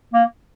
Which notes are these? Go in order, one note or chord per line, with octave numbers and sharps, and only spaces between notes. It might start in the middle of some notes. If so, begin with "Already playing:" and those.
A#3